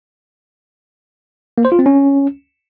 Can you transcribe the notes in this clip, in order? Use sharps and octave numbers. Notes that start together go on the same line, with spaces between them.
A#3
C5
F4
C4
C#4